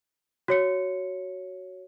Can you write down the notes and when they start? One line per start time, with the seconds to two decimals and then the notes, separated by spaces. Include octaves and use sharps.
0.48 F#4 C#5 C#7